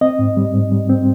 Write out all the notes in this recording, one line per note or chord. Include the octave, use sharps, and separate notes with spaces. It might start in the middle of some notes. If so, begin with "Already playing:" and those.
C4 D#5
G#2
G3
G#2
G3
C4